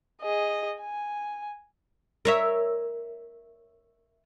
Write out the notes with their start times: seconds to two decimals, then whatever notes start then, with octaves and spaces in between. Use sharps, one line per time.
0.22 G#4 D#5
0.80 G#5
2.25 A#4 C#5 E5